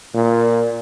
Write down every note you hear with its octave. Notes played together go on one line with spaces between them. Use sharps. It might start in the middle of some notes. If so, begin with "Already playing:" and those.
A#2